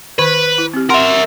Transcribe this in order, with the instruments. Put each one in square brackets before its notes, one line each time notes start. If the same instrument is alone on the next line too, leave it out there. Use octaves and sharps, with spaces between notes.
[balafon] D#3 B5 [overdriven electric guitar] B4
[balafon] E4
C4 G4
[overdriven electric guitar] A#4 E5 [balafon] F#5 C6